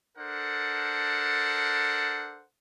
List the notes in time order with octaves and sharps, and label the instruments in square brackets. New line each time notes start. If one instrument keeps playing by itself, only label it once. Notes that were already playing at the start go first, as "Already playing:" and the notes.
[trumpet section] D4 A4 A#4 C5 F#5